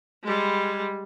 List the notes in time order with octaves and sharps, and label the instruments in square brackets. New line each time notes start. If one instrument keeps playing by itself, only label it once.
[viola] G3 G#3